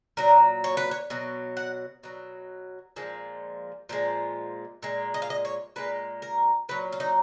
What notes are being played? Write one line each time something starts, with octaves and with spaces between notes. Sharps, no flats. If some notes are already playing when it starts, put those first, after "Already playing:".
A#2 F#3 A#4
C#5
B4
C#5
B2 F#3
F#5
B2 F#3
A#2 F3 G#3
A#2 F3 G#3
A#2 G#3
D#5
F5
D#5
C#5
A#2 G#3 B4
A#4
A#2 F#3 B4
F4
D#4